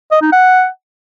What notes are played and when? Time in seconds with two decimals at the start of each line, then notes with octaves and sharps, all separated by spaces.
0.11 D#5
0.22 D#4
0.32 F#5